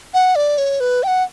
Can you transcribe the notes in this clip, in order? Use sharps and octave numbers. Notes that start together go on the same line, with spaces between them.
F#5
D5
C#5
B4
G5
F#5